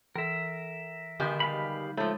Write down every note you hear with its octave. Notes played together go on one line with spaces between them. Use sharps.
E3 A#4 E5
B2 D3 D#3 G#3 D#4 G6
G3 F5 B5
F3 G#3 A3